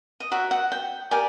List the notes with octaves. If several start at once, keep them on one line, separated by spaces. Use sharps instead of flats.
D#5
F#4 A#4 C#5 E5
F#5
G5
G4 A#4 D5 G#5